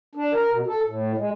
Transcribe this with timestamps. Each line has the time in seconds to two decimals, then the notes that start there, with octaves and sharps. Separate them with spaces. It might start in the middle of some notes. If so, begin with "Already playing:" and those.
0.15 D4
0.33 A#4
0.51 B2
0.67 A4
0.86 A2
1.17 G#3